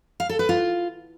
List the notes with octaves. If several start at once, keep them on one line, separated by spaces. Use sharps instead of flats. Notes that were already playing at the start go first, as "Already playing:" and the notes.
F5
A4
B4
F4